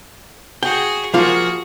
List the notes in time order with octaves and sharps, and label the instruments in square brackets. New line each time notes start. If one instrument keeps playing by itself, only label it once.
[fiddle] F#4 G#4 [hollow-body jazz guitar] G5
[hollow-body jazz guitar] F3 A#3 F4 [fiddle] F#4 G#4